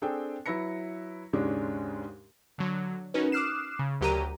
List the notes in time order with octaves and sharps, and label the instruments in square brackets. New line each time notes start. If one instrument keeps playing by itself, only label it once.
[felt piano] C4 D4 G#4 A4 G5
F#3 E4 B4 A#6 C#7
D#2 G#2 C#3 G#3 C#4 D4
[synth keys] D3 F#3
C#4 D#4 F#4 A#4 B4
D6 D#6 F6 F#6 C7 E7
C#3
D2 F#3 G4 A#4 A#5 D#7